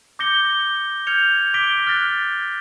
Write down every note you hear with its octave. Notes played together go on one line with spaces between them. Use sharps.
D6 G6 A#6 C#7 G7
F6 G6 G#6 C#7 F7
D6 A#6 B6 D7 G7
F6 F#6 A6 A#6